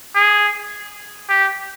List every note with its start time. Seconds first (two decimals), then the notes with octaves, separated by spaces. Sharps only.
0.15 G#4
1.29 G4